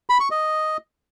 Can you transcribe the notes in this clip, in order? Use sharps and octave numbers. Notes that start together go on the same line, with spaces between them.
B5
C#6
D#5